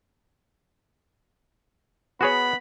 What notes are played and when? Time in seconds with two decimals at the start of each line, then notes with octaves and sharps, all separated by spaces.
2.21 B3 F#4 G#4 C#5 B5